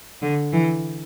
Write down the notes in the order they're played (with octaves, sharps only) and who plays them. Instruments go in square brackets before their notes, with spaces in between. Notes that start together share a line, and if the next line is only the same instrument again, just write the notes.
[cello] D3
E3